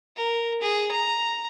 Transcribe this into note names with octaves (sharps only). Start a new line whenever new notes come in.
A#4
G#4
A#5